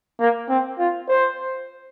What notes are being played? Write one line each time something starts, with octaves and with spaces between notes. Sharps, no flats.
A#3
C4
F4
C5